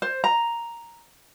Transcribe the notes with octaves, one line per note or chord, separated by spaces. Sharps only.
C5
A#5